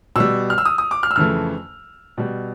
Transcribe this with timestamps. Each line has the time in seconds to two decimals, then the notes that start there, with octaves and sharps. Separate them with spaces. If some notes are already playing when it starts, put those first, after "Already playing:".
0.16 B2 G3 E6
0.50 F6
0.58 E6
0.65 D#6
0.78 D#6
0.91 D6
1.03 F6
1.11 E6
1.16 F2 C#3 E3 A3 F6
2.18 B2 G3